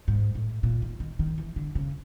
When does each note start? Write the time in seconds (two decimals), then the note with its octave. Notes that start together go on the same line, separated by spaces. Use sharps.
0.08 G#2
0.35 A2
0.63 A#2
0.82 D#3
1.00 D#3
1.19 D#3
1.38 E3
1.56 D3
1.75 C#3